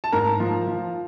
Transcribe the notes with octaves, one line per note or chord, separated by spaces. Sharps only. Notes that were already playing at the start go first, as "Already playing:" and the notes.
A5
G#2 A#4 A#5
F3
F3